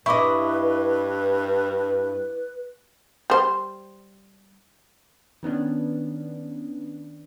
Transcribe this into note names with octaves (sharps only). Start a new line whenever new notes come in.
G2 E4 B4 D#5 C#6 D6
G3 C5
D#3 B3 C#4 D4